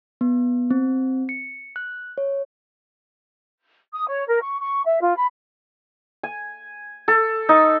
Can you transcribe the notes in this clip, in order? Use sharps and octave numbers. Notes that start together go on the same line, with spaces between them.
B3
C4
C#7
F#6
C#5
D#6
C#5
A#4
C#6
C#6
E5
F4
B5
G#5
A4
D#4